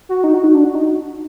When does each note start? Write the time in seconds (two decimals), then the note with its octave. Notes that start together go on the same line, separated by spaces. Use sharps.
0.09 F#4
0.24 D#4
0.34 F#4
0.44 D#4
0.54 D4
0.64 F#4
0.75 D#4